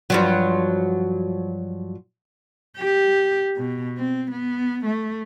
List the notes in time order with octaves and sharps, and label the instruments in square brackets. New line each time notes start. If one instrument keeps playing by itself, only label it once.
[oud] G2 F3 F#3
[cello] G4
B2
C4
B3
A3